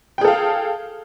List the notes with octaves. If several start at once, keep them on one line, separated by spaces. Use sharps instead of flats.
G#4 A4 F5 G5